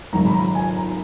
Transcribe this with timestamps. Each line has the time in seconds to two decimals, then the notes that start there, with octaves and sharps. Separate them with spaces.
0.13 G#1 F#2 C#3 A#5
0.26 B5
0.34 A#5
0.55 G#5
0.76 A#5